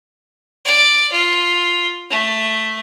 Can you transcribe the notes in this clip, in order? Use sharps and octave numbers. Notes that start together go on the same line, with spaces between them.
D5
F4
A3